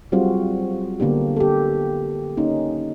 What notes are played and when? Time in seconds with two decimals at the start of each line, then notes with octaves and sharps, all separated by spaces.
0.12 F#3 G3 C4 F4 F#4 G#4
1.00 D3 A#3 B3 D4 G4
1.36 G4 A4
2.37 A#3 C#4 D#4